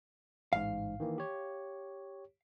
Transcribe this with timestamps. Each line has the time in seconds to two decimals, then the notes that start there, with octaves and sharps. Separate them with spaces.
0.53 A1 G#2 F5
1.00 D#3 E3 A#3
1.18 G4 C#5